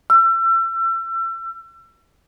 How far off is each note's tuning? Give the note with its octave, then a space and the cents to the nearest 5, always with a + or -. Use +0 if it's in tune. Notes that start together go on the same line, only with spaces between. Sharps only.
E6 +35